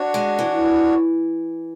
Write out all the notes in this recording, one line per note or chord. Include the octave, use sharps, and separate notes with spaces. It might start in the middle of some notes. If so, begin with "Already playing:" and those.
Already playing: D4 F#4 C#5
G#3
E3